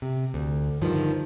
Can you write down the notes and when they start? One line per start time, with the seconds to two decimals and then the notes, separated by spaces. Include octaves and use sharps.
0.02 C3
0.34 D2
0.81 G2 D3 D#3 F3